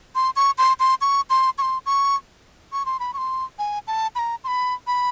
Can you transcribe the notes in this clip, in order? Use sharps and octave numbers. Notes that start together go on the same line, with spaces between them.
C6
C#6
C6
C6
C#6
C6
C#6
C6
C#6
C#6
C6
B5
C#6
C6
G#5
A5
B5
A#5
C6
B5
B5